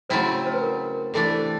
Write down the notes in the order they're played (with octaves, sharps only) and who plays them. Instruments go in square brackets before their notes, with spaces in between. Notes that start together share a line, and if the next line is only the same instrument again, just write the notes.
[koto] C#3 F#3 A3 C4 E4 [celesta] C5
[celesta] C5
B4
A#4
[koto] C3 E3 A3 D4 [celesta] A4